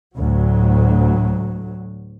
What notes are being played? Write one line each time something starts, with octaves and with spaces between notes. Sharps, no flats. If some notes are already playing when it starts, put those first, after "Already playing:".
D2 A2 F#3